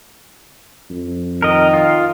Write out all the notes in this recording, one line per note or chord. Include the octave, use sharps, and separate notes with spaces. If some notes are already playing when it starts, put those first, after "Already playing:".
F2
D#3 A#4 D#5
F4